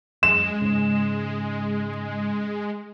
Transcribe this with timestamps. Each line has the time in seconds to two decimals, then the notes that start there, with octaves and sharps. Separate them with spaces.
0.23 F#2 G#3 E7
0.62 G#2 C#3